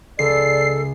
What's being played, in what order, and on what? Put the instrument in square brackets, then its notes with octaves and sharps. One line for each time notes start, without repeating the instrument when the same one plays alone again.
[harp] C#2 [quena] A4 [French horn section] D5 [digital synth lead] C7